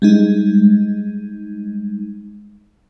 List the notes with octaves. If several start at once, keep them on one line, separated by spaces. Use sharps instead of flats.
G3 G#3 D#4